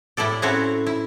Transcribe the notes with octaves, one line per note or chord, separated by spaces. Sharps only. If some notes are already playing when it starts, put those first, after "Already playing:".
A2 E4 G4 A4 D5
C4 C#4 E4 F#4 A4 C#5
E4